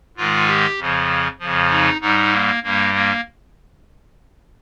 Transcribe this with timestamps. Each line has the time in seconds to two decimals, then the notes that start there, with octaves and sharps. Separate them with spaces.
0.17 G#2 D#3 G#3 F4
0.48 G4
0.78 F2 C#3 F3
1.40 F2 C#3 F3
1.70 D#4
2.01 G#2 G3 D#4
2.32 A#3
2.63 G2 G3 A#3
2.94 A#3